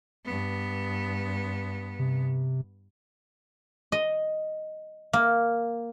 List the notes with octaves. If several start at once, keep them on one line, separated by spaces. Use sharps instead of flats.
G2 B3
C3
D#5
A#3